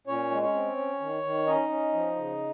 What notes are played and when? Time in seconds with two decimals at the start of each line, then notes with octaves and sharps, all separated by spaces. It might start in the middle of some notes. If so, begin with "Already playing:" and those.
0.07 A#2 C#4 C#5
0.31 G#3
0.42 C#4 C#5
0.54 C4
0.77 C#4
1.00 D#3
1.23 D#3
1.47 C#4 D#4 D#5
1.69 C#4
1.93 F3
2.16 C#3